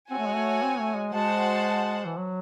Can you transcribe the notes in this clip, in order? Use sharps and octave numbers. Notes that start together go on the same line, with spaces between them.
C4 F#4 C#5 G#5
A3
G#3
A3
C4
A3
G#3
G#3 F#4 C5 F#5 A5
E3
F#3